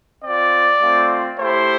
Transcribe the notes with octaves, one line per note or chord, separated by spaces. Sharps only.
C4 F4 D5
A3 C4 F4
A3 E4 G4 C5